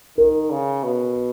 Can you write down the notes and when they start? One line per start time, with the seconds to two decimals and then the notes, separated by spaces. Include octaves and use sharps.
0.18 D#3 A#4
0.50 C#3
0.83 B2